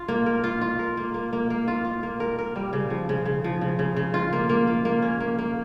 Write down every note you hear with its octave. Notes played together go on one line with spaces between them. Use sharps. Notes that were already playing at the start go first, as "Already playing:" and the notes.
Already playing: F4
A#3
A#4
F4
F4
A#4
A#3
A#3
A#3
A#3
F4
F4
A#3
A#4
A#4
G3
C#3
F3
C#3
C#3
F3
C#3
C#3
C#3
F4
A#3
A#3
F4
A#3
C#4
A#3
A#3